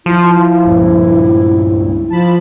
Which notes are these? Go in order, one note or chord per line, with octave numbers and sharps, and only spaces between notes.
F3 E4
C#2 G2 A#2
F3 A5 B5